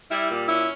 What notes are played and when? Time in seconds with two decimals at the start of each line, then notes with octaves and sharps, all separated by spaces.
0.11 G3 E4
0.30 A#2
0.48 C#4 E4